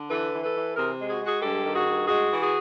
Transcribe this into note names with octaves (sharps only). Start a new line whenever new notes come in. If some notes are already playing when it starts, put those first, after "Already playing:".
Already playing: D3
E3 A4 B4
E3
A4 B4
E3
C3 G#4 A#4
G#3
F#4 G#4
G#3
F#4 G#4
G2 G4 A4
D#3
F#4 G#4
G2
G#3 F#4 G#4
E3
F#4 G#4